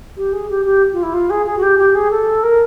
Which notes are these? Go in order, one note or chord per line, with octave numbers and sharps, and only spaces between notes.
G4
G#4
G4
G4
F4
E4
F4
G#4
G#4
F#4
G4
G4
G#4
A4
A#4